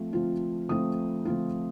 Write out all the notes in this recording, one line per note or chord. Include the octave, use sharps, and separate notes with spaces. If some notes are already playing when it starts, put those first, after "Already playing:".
Already playing: F3 A3 C4 F4
F3 A3 C4 F4
F3 A3 C4 F4 D#6
F3 A3 C4 F4